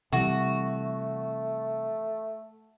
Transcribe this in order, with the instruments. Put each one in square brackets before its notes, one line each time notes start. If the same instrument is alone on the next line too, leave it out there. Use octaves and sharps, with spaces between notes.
[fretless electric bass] C3 E3 G3 [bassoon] A3 [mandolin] F#4